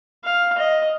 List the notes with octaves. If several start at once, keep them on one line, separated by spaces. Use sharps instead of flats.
F5
D#5